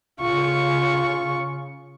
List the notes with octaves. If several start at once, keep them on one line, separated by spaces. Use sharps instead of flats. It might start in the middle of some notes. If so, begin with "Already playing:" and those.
C#3 F4 C#6